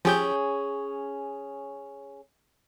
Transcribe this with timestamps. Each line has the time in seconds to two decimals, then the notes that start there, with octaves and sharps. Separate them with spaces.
0.05 F3 C#4 G4 G#4 G6